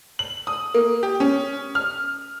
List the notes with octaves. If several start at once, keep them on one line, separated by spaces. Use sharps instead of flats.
F#7
D#6
A#3
G4
C#4
F6